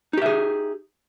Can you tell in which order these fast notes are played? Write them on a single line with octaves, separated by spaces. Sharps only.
D#4 G4 E5 G#4